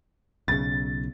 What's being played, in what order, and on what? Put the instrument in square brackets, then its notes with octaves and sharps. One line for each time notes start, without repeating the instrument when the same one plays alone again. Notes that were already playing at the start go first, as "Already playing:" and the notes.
[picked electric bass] B1 C#3 [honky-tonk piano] A6